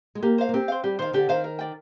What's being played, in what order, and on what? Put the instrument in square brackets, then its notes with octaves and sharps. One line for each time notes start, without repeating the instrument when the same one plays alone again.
[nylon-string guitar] G#3
[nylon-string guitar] A#3 [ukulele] G4
[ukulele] C5 F5
[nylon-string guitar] A#3
[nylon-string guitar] C4 [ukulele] G4
[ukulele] C5 F5
[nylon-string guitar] G3 [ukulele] G4
[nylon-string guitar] D#3 [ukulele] C5 F5
[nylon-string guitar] D3 [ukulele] G4
[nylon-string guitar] D#3 [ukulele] C5 F5
[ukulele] A#4
D5 G5